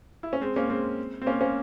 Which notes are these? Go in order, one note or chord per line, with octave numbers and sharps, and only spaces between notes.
E4
C#4
G#3 C4
A#3 C#4
G#3 C4
C4
A#3 C#4
A#3 C#4